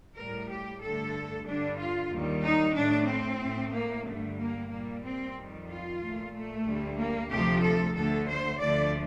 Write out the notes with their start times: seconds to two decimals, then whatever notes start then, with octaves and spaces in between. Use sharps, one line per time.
0.17 A2 G3 A#4
0.50 G4
0.81 G2 D3 A3 A4
1.46 G2 D3 G3 D4
1.79 F4
2.12 D#2 D#3 G3
2.45 D#4
2.77 A2 A3 D4
3.09 C4
3.41 A2 A3
3.73 A#3
4.06 G2 D3 G3 A3
4.39 A#3
4.71 A#2 G3 A#3
5.04 C4
5.36 F2 D#3 G3
5.69 F4
6.01 A#2 A3
6.34 A3
6.65 D2 D3 G3
6.99 A#3
7.30 D2 C3 F3 A3 G4
7.63 A4
7.96 D2 D3 A3 A4
8.29 C5
8.60 D2 D3 F3 A3 D5